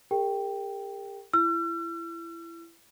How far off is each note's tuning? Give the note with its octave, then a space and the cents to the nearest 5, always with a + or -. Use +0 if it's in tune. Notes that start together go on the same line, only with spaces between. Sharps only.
G4 +35 A#4 -30 G5 +0
E4 +25 E6 +45